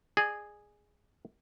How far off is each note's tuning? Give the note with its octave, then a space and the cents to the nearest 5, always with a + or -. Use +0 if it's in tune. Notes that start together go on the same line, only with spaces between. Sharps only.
G#4 +0 D5 +40